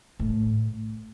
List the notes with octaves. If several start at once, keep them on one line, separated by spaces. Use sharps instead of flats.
A2